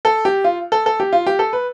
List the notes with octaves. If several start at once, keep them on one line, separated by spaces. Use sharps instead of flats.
A4
G4
F4
A4
A4
G4
F4
G4
A4
B4